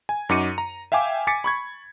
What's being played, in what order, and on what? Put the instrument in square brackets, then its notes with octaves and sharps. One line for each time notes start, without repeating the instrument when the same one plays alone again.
[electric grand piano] G#5
F#2 D#4 F#4 D6 C#7 D#7
A#5
E5 F5 G5 G#5 D6
G#5 D6 A6 B6 C#7
B5 C#6 G#6